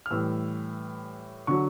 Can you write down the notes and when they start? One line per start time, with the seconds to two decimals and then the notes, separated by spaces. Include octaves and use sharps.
0.06 F6
0.10 A2 E3 G3 E6
1.47 D3 F#3 C#6